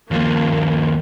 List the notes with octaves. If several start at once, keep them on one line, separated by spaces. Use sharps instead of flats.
D#2 F3 A#3